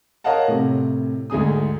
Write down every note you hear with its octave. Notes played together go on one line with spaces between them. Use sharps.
A#4 C#5 D#5 F5 F#5 A5
A2 C3
D2 G#2 D#4 G#4 D#6